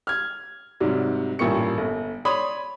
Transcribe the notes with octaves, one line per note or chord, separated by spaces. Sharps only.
F6 G#6
G#2 C3 F#3 G3
A1 G2 A#2 A#3 C#6 C#7
G1
C#5 D5 B5 C6 D#6